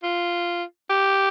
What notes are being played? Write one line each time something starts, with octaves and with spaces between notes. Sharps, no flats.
F4
G4